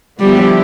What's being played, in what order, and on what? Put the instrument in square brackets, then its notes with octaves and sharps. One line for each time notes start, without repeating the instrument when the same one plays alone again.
[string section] D3 F3 B3 E4 G4 [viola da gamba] G3